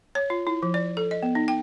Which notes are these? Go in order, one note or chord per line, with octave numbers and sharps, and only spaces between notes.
C#5
F4
E4
F3
D5
A4
D#5
B3
D#4
G5